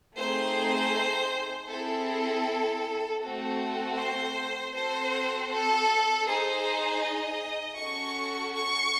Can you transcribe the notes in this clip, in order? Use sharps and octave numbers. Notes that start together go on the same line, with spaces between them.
A3 C4 D#4 G#4 C5
C4 E4 G#4 A4
A3 C4 F#4 A4
C5
C4 F#4 A4 C5
A4
D#4 G#4 C5
D#5
C#4 F#4 A4 C#6
C#6